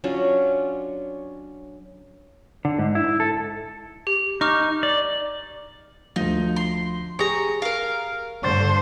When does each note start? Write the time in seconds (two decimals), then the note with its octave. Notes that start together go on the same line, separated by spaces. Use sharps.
0.04 F#3 C#4 D4 F4
2.65 D3
2.79 G#2
2.95 E4
3.20 A4
4.07 G4
4.41 D#4 C#6 D6 F6
4.83 D5
6.16 D2 F3 D#4
6.56 C6
7.19 G4 G#4 C#5 A#5 D#6
7.62 A#4 F5
8.43 G2 D3 C5 C#6 A6